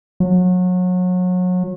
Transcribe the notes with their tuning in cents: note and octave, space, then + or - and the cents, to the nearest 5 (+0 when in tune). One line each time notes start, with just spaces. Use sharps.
F#3 -30